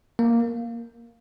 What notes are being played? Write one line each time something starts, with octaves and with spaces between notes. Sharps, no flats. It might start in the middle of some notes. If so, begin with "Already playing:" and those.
A#3